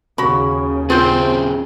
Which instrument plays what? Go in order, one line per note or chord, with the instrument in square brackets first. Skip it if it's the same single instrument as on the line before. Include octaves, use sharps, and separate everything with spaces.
[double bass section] D#2 C#3 [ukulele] F#4 B5
[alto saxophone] C4 [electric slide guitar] C#4 G4 G#4 [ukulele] F4 C5